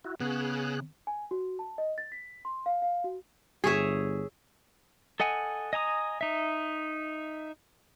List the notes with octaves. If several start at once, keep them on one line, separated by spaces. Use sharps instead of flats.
E4 F#4
C#3 B3 G#4 F#6
G#5
F#4
A5
D#5
A6
B6
C6
F5
F5
F#4
G1 G#4 C#5 E5
A4 D#5 F#5 G#5
D#5 G#5 A#5 D#6
D#4 E5